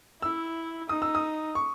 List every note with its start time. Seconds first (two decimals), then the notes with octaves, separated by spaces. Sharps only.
0.22 E4 E6
0.89 D#4 D#6
1.02 E6
1.15 D#6
1.55 C#6